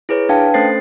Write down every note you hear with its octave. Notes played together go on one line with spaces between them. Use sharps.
E4 G#4 B4 C#5
D4 B4 F5 G5 A5
A3 C#4 A4 C5 A6 C7